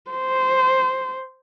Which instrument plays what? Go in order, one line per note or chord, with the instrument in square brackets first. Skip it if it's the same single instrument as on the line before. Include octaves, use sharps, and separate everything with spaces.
[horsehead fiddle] C5